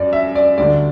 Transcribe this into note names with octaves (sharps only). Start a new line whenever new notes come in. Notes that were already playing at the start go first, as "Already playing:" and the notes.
Already playing: F#2 D5
E5
D5
D2 D3 G3 D5